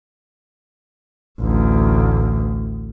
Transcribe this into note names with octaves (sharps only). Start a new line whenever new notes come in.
A1 D2